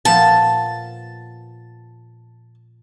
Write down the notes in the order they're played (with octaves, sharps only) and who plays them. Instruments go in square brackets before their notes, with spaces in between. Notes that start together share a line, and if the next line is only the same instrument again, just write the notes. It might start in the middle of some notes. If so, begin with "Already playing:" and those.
[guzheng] A#2 F3 B3 [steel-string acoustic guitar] A5